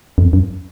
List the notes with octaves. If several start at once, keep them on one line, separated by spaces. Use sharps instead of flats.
F2
F#2